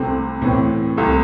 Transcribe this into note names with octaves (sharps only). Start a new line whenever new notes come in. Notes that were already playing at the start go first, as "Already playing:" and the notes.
Already playing: C2 C3 A3 C4
A2 E3 C4
C2 C3 A3